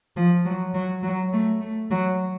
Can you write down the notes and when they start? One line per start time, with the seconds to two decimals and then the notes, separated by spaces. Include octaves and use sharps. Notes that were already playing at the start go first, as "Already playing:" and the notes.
0.17 F3
0.46 F#3
0.74 F#3
1.03 F#3
1.33 A3
1.61 A3
1.91 F#3